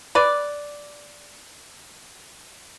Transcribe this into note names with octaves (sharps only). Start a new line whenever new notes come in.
B4 D5